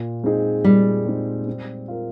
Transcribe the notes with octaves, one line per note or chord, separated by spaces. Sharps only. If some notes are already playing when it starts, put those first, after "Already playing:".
Already playing: A#2
G#3 C4 D#4 G#4
A#2 G3
G#3 C4 D#4 G#4
C4
F4 A#4